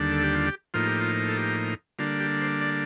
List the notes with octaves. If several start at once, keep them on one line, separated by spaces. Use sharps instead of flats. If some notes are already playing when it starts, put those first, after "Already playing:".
Already playing: D#2 D3 G3 D4
A4
G4
F4
G4
A2 F3 A#3 D#4 F4
G4
F4
A4
G4
D3 G3 A#3 D4 F4
G4
C5
D5